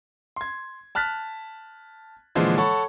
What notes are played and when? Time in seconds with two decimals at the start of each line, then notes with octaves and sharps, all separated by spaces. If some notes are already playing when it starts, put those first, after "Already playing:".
0.36 C6 G#6
0.95 A5 F6 F#6 A6 B6
2.35 A#2 D3 E3 F3 G#3
2.58 A4 C#5 F#5 A5 B5 C#6